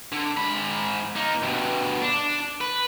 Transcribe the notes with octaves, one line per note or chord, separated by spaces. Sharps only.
D3
G#2 B5
A#3 D#4
G2 B2
D4
B4